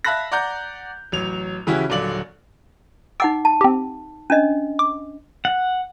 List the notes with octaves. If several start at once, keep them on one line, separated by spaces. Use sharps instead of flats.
E5 F5 A5 B5 F#6 A#6
D5 F#5 A#5 G6
A1 F#3 F7
C#3 E3 C#4 E4 F#4 G4
D#1 D3 F#3 D5 F5 F#7
D#4 F#5 G5 D6 E6 A6
A5
C4 G4
C#4 D4 D#5
D6
F#5